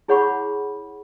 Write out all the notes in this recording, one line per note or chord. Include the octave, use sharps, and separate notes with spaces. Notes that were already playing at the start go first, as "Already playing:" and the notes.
E4 G#4 C#5 F#5 B5 C#6